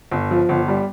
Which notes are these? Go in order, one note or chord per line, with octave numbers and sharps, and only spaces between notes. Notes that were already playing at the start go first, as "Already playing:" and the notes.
G1
F3
G1
G3